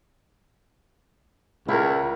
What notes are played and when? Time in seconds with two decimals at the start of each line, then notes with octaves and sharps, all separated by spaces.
1.68 C#2 E4 A#4